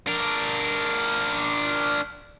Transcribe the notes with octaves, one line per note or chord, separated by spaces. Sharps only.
D4 A#4